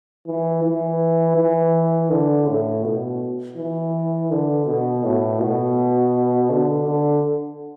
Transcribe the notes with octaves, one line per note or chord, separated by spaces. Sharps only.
E3
E3
E3
D3
A2
B2
E3
D3
B2
A2
B2
D3
D3